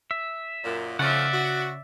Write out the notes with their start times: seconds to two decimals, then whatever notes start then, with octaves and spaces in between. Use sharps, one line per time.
0.11 E5
0.64 F#2 A#2
0.99 C#3 F3 A3 C#4 D5 E5 F#5
1.34 F#4